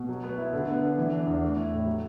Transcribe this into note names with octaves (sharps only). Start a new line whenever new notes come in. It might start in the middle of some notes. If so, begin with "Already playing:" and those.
Already playing: B2
F#3
B3
E4
D3
B3
D4
E3
D4
E2
A3
E4
A2
F#3